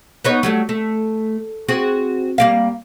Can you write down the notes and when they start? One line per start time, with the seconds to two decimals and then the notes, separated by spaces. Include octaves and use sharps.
0.24 B3 D#4 C#5
0.43 F#3 G3 A3
0.69 A3
1.68 C4 F#4 G#4
2.38 G3 A#3 F5